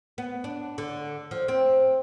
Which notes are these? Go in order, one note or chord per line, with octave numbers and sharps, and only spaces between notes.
B3
D4
D3
F3
C4